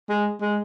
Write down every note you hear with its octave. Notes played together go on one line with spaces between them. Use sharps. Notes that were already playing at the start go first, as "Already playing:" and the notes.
G#3
G#3